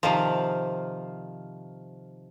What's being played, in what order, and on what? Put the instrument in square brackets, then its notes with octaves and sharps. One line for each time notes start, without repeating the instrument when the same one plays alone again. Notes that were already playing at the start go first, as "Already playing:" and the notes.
[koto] C3 D#3 F3